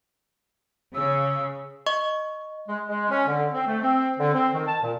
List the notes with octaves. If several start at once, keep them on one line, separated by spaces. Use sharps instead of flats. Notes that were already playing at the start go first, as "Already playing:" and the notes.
C#3 E6
D#5 C#6
G#3
G#3
C#4
D3
C4
A3
C4
D3
C4
D#3
A5
A#2